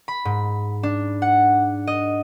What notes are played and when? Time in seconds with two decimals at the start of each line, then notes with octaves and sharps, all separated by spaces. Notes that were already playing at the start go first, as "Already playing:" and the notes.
0.08 B5
0.25 G#2
0.83 D4
1.22 F#5
1.87 D#5